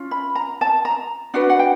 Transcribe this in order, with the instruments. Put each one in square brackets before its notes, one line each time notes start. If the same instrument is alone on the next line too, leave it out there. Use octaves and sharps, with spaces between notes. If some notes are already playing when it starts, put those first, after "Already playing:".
Already playing: [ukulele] C#4 F4
B5
A#5
A5
A#5
D4 F#4 B4 F#5
F#5
G5